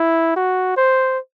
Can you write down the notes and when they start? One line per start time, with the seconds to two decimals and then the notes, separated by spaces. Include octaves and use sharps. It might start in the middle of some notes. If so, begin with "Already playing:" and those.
Already playing: E4
0.36 F#4
0.77 C5